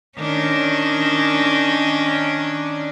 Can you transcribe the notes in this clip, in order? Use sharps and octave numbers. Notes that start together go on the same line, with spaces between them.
D#3 C#4 D4